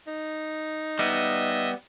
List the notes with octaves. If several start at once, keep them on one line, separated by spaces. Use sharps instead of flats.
D#4
G3 B3 D#5 E5